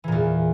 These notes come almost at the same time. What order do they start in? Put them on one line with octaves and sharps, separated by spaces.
E3 A#2 E2